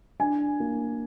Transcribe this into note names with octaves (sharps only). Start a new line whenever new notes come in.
D4 G#5
A#3